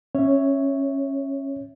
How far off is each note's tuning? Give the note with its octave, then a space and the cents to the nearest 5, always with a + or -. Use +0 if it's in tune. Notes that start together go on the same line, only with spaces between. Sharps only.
C#4 -20 C#5 +0 E5 +0